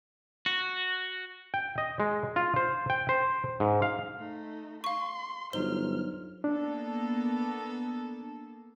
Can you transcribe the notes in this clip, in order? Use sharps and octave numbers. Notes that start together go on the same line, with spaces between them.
F#4
G5
D#5
G#3
F4
C5
G5
C5
G#2
F5
A3 D#4
F5 C6 C#6
G1 F#3 D#4 C5 F6 G7
A#3 B3 D4 A4